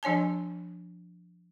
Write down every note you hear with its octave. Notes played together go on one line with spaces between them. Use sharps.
F3 D4 C#5 G#5 A5